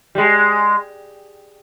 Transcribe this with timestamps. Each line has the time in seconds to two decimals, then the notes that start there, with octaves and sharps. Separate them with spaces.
0.15 G3
0.18 G#3